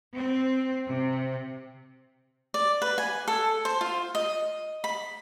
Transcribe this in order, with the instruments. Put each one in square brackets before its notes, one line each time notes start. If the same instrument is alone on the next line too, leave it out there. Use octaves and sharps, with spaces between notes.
[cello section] C4
C3
[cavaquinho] D5
B4
G#5
A4
C5
F4
D#5
B5